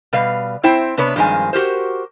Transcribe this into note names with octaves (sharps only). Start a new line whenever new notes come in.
B2 G3 B4 F5
C4 E4 C5 G5
C3 B3 D4 B4 C#5
G2 D#3 F3 G#3 C4 G#5
F#4 G4 A#4 C5